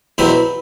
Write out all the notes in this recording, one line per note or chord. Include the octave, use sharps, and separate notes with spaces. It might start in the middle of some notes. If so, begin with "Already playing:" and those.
E2 B2 F#3 C4 B4